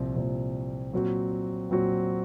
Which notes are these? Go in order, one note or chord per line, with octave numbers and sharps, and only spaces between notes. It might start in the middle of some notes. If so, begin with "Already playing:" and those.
Already playing: C2 A#2 F3 C4
C2 A#2 F3 C4
A#2 F#3 C4 F#4
A#2 F#3 C4 F#4